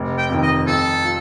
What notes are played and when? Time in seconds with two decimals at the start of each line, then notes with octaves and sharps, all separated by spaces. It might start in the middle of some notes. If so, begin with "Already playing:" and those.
Already playing: F1
0.18 G5
0.30 F2 D#3
0.43 D#5
0.67 F2 A4
1.05 F4